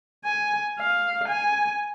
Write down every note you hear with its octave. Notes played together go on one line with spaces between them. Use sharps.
G#5
F5
G#5